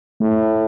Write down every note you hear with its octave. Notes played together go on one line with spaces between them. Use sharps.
A2 A3